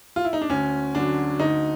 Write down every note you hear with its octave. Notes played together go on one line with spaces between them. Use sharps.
F4
E4
D#4
D4
D2 C#4
D3 F#3 D4
D2 D#4